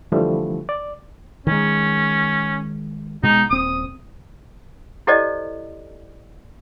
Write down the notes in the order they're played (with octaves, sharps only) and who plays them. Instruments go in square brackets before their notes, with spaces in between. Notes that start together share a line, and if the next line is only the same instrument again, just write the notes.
[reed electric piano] D3 E3 F3 G3 A3
D5
[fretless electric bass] D#3 G#3 [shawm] C#4
[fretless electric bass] B2 G#3 [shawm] D#4
[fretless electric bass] D#1 C4 [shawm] D#6
[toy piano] E4 G4 A4 C5 D5 D#5